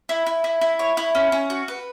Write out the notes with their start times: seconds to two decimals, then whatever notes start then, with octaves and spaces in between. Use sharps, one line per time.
0.09 E4
0.26 E4
0.44 E4
0.61 E4
0.79 C#5
0.97 E4
1.15 C#4
1.32 C#4
1.50 F#4
1.68 B4